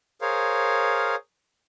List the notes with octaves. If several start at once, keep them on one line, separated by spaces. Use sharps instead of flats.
G#4 A#4 C5 C#5 F5